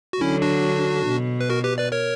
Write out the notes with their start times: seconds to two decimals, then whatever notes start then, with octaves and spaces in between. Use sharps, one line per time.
0.13 F#4
0.21 D3 F#3 C#4 E4
0.42 D4 F#4
1.06 B2
1.41 B4
1.50 F#4 A#4
1.64 G4 B4
1.78 B4 D5
1.92 A#4 C#5